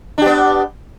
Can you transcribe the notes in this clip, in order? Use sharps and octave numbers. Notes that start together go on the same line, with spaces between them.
B3 D4 G4